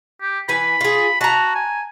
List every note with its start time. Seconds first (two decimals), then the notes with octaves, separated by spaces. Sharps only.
0.21 G4
0.49 E3 B4 G#5 B5
0.81 F4 G#4
1.21 F#4 A5 A#5
1.55 G#5